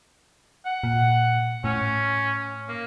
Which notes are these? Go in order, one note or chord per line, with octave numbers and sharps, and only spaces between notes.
F#5
A#2
A2 C#4
A#3